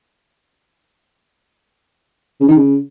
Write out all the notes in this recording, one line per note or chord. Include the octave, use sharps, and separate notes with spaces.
C#3
D#3
C#3